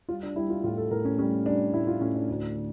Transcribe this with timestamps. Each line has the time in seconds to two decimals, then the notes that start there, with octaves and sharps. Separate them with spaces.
0.09 G3 F4
0.23 D4
0.36 G3 E4
0.50 F4
0.64 A2 F4
0.77 A4
0.91 A2 A#4
1.05 C#4
1.18 G3 C#4
1.46 G3 D4
1.73 A2 E4
1.87 F4
2.01 A2 C#4
2.15 D4
2.29 D2
2.56 D3